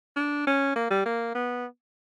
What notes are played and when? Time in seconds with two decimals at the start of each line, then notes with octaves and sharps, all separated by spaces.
0.16 D4
0.47 C#4
0.76 A#3
0.91 G3
1.06 A#3
1.35 B3